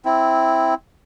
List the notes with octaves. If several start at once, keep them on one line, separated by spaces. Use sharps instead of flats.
C4 E4